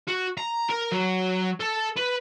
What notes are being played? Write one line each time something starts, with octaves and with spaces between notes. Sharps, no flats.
F#4
A#5
A#4
F#3
A4
B4